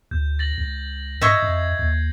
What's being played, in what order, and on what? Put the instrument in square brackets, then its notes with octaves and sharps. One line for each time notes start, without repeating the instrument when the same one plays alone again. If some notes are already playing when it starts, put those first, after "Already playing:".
[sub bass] D2 [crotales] G6
[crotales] A6 A#6 F#7
[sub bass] C#2
[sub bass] G#2 [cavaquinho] D#5 E5 C#6 [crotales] G6 G#6 C7
[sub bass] F2
D#2